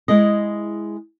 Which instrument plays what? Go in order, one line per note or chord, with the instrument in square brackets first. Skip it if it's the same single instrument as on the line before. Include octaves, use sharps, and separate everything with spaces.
[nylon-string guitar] G#3 E4 G#4 D#5